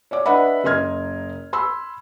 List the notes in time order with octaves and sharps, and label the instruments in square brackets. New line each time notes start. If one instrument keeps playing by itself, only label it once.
[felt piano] C#5 D5 D6
D4 B4 D#5 E5 F#5 B5
F#1 A#4 D#5 C6 F6 G#6
B5 C6 E6